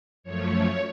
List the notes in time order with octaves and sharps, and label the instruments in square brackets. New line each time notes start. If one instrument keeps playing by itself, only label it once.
[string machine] F#2 F3 A3 C#5